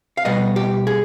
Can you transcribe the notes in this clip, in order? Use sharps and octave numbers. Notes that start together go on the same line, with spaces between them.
F5
B2 G3 B3 D#5
G4
G#4